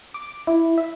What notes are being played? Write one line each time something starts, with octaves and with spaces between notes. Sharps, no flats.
D6
E4
E5